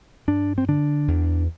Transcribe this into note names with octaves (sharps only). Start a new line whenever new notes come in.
G2 D4
C4
D3 D4
E2